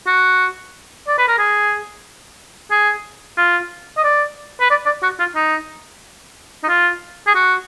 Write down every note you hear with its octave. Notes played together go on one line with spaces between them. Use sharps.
F#4
D5
B4
A#4
G#4
G#4
F4
D#5
D5
B4
D5
D5
F#4
F4
D#4
D#4
F4
G#4
F#4